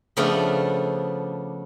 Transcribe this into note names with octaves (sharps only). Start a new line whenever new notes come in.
C#3 F3 A3 B3 D4